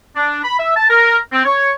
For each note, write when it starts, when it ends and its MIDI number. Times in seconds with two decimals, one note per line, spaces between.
0.16 0.40 62
0.44 0.58 83
0.59 0.72 76
0.77 0.89 81
0.90 1.17 70
1.33 1.42 60
1.45 1.72 73